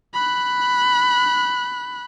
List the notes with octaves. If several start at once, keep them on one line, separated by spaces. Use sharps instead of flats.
B5 F#6